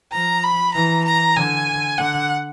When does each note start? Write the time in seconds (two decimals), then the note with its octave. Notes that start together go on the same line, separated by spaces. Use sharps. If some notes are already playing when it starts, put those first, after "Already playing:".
0.12 F3 A#5
0.44 B5
0.74 E3 A#5
1.05 A#5
1.36 D3 G#5
1.98 D3 F#5